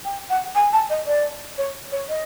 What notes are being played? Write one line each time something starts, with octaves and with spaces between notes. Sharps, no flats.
G5
F#5
G#5
A5
D#5
D5
C#5
C#5
D#5